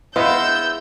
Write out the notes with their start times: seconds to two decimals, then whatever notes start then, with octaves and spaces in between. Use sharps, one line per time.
0.16 G#3 B3 E4 D#5 F5 E6 G6